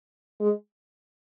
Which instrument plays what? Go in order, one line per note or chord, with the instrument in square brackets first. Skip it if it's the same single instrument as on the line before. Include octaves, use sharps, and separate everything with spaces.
[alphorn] G#3